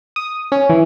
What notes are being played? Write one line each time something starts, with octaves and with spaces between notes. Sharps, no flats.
D#6
C#4
E3